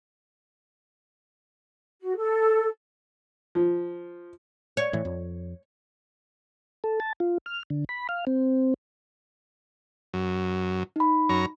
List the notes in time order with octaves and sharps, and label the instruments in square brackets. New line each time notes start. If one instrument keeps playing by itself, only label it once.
[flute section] F#4
A4
[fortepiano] F3
[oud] C#5
[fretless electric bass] A2 E3
F2
[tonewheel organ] A4
A5
F4
F6
D3
B5
F5
C4
[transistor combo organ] F#2
[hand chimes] D#4 B5
[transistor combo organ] F#2 C#5 A#5